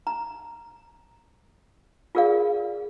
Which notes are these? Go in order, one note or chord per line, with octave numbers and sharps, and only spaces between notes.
A#5
F4 G#4 A#4 D5 F5